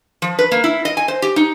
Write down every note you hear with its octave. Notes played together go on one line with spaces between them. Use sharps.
F3
B4
A#3
E4
D#5
G#5
C5
G4
D#4